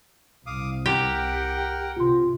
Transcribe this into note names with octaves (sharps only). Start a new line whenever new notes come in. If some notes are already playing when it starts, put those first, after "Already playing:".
C2 F5 D6 D#6
G4 A#4 F#5 G5
C3 F4 C6